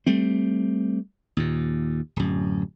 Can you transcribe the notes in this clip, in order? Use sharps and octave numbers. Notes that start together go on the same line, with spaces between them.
G3 A3 C4
D#2 A#2
D1 F#2